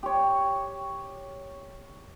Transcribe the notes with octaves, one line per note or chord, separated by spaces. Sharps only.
G4 C#5